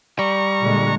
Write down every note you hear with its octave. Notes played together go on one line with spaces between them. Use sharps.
G3 A#5 C#6
A#2 D3 G#3